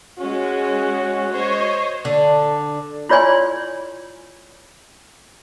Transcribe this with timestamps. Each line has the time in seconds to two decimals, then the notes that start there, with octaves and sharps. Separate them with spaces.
0.18 G#3 C#4 F#4
1.33 C5 C#5 D#5
2.05 D3 D4
3.09 E4 F4 C#5 D5 G#5 C6